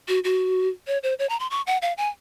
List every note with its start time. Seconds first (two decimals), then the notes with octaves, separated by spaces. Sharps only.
0.08 F#4
0.24 F#4
0.87 C#5
1.03 C5
1.19 C#5
1.29 A#5
1.40 C6
1.51 C#6
1.67 F#5
1.82 F5
1.98 G#5